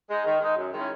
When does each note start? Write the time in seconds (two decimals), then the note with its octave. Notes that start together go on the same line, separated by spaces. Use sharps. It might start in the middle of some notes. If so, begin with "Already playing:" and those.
0.09 G#3 D#4
0.25 D#3
0.40 G#3 D#4
0.56 F#2
0.73 D#3 G#3 C#4 E4